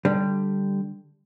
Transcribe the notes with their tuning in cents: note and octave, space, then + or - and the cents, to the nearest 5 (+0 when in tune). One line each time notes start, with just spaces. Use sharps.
D3 +0 G3 +0